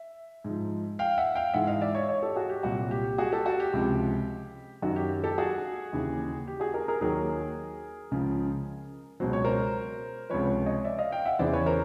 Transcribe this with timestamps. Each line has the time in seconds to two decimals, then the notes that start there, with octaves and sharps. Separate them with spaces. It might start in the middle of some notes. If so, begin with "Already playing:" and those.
Already playing: E5
0.44 G#2 F3
0.99 F5 G5
1.18 E5 F#5
1.35 F5 G5
1.54 G#2 E3 E5 F#5
1.67 D#5 F5
1.81 D5 E5
1.95 C#5 D#5
2.08 C#5 D#5
2.22 G4 A4
2.36 F#4 G#4
2.50 G4
2.63 C2 A#2 F#3 F#4
2.91 G4
3.18 F#4 G#4
3.32 G4 A4
3.46 F#4
3.60 G4
3.73 C#2 C3 F3
4.82 F#2 D#3 F#3 F#4
4.96 G4
5.24 G4 A4
5.38 F#4 G#4
5.93 D#2 C#3 E3
6.47 G4
6.60 F#4 G#4
6.74 G#4 A#4
6.88 G#4 A#4
7.01 D#2 D#3 F#3 G#4 A#4
8.11 C#2 C#3 F3
9.20 C#2 B2 F#3 C5
9.33 C#5
9.45 A#4 C5
10.30 C#2 C3 F3 B4 C#5
10.66 C#5 D#5
10.84 D5 E5
10.98 D#5 F5
11.12 F5 G5
11.25 E5 F#5
11.39 E2 C#3 E3 C5 D5
11.53 B4 C#5
11.66 A#4 C5